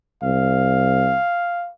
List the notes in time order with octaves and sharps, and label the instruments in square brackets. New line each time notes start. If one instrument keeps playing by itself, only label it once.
[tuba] C2 [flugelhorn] F5